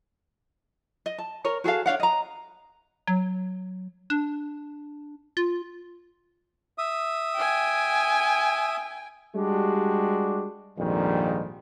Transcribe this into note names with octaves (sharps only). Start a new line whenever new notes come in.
D#5
A5
A#4 C#5
F#4 G#4 A4 F5
D4 C#5 F5 F#5
D#5 A#5
F#3
D4
F4
E5 D#6
G5 G#5
G3 G#3 D4 F#4 G4
A#1 F2 G#2 D#3 G3